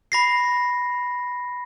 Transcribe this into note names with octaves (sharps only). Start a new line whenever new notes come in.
B5 A#6 C7